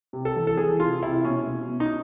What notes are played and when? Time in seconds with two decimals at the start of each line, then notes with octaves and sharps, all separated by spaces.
0.13 C3
0.25 A4
0.36 E3
0.47 A4
0.57 E3 G#4
0.80 C3 F4
1.03 C3 E4
1.25 B2 C#4
1.47 B2
1.69 B2
1.80 D#4